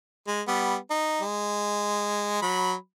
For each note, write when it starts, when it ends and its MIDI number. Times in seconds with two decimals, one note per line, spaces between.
0.27 0.41 56
0.48 0.76 55
0.48 0.76 59
0.91 1.21 63
1.21 2.38 56
2.42 2.74 54
2.42 2.74 83